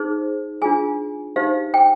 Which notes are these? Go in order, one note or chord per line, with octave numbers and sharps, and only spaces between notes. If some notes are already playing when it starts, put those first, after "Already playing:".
Already playing: D#4 G#4 C5
D4 F4 G#4 G#5
D#4 G4 C5 F5
G5